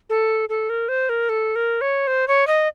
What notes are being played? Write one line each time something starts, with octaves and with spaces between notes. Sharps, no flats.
A4
A4
A#4
C5
A#4
A4
A#4
C#5
C5
C#5
D#5